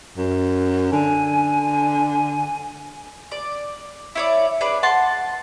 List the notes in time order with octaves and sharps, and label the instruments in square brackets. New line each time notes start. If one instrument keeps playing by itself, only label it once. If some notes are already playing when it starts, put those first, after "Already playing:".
[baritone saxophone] F#2
[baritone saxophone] D3 [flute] G#5
[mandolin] D5
E4 C#5 D5
D4 G#4 B4 D5
F#5 A5 C6